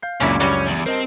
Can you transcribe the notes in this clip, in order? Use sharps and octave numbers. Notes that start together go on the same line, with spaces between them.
F5 G6 C7
C#2 F#2 A#2 C#4 D4 E4
G3 C#4 F#4 D5
E2
C4 A#4 D#5 A5